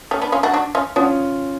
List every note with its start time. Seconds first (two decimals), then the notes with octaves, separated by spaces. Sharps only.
0.11 A3 C#4
0.22 B3 D4
0.32 C#4 F4
0.43 D4 F#4
0.54 D4 F#4
0.75 C#4 F4
0.96 B3 C#4 D4 F4